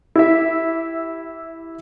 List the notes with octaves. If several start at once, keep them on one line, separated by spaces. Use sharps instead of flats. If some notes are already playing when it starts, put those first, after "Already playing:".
E4 G4 E5